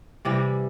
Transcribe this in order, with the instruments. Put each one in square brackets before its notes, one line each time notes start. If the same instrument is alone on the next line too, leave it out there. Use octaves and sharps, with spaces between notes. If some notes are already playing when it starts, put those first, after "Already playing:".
[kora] C3 E3 G3